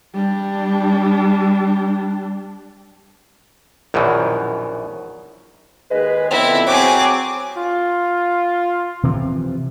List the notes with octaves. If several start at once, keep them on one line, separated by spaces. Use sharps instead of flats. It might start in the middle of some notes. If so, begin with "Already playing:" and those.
G3 D4
A#1 F#2 B2 D#3 E3
D#2 G#3 G#4 B4
F2 D3 B3 C4 E4
F#3 C4 G#4 D6
F4
C3 E3 F3